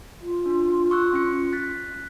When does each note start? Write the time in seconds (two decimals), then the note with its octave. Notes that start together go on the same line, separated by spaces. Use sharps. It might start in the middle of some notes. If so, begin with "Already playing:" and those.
0.21 F4
0.46 D4
0.91 C#6 E6 F#6
1.13 C#4 C#7
1.53 F#6 A6 B6